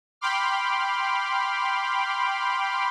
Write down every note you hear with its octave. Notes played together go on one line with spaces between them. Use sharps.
G5 B5 C6 D6 F6